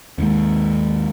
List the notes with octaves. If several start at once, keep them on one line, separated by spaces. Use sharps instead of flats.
D#2 G#2